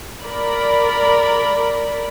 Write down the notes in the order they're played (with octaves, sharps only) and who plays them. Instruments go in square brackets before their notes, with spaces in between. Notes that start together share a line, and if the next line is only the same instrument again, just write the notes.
[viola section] A#4 D5 B5